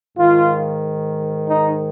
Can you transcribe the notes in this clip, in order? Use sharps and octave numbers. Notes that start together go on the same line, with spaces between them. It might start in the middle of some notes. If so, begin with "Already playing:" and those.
G#2 D#3 F4
D#4